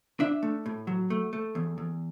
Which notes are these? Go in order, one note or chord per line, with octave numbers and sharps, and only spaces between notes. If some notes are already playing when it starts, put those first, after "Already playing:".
D4 E5
A3
A2
F#3
A3
A3
E2
E2